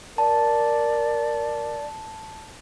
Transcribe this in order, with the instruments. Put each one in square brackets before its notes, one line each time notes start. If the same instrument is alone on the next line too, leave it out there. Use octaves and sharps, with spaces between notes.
[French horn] A#4 [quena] D5 [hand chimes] A5